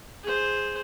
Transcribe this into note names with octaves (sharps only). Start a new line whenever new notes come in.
G#4 C5